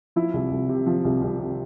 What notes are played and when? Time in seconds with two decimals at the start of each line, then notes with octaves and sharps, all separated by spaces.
0.16 F3 E4
0.33 C2
0.51 C2
0.69 C3
0.86 F3
1.05 C2
1.22 C2
1.39 C3